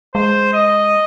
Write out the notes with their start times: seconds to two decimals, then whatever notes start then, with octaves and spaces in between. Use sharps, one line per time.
0.15 G#3 C5
0.53 D#5